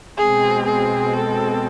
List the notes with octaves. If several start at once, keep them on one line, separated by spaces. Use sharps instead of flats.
B2 G#3 C4 G#4
G#4
A4